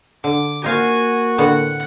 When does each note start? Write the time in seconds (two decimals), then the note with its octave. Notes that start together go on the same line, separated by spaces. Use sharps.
0.24 D3 D6
0.64 A#3 D#4 F4 F#4 A#4 C5 F5 G#5
1.38 A2 D3 B3 F#5